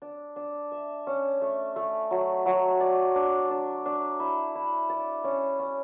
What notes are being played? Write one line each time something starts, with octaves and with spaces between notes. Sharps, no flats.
D4
D4
E5
C#4
A3
A3
F#3
F#3
D5
D4
D4
D4
E4
E4
D5
C#4
C#4